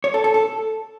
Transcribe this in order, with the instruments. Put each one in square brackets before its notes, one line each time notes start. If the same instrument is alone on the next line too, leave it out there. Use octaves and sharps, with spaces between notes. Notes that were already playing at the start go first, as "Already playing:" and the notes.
[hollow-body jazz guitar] C#5
A4
A4
A4